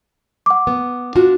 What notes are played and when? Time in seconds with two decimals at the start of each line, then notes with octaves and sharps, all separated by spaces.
0.46 F#5 D6
0.67 B3
1.15 D4 F4 F#4